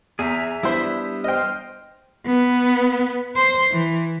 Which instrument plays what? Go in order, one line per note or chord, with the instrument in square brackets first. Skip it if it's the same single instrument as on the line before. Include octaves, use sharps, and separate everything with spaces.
[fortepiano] E2 [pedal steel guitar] G#4 G#5 A#5 [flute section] E5
[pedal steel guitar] G3 B3 D4 [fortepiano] E4 C5
[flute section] C5 F6 [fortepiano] D#5 G5
[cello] B3
C5
E3